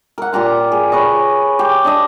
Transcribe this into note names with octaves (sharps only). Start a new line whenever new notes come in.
A#4 F#5
A#2 G4 A#5 C6
G#4
G#4 B4 C#5 D#5
G4
D4 G4 D#5